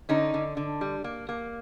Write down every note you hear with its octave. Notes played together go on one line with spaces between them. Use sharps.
D3 C#4 D#4
D3
D3
G3
A#3
A#3